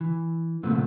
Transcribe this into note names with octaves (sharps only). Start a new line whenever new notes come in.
E3
A#2 C#3 F3 A3 B3 C4